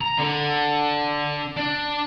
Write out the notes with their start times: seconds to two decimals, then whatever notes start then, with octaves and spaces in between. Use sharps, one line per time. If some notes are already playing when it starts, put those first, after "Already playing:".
0.01 A#5
0.19 D3
1.56 D4